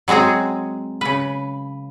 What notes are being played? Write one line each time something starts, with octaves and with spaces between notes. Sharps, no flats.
F#3 G#3 C4 F#4 G#4
C#3 B4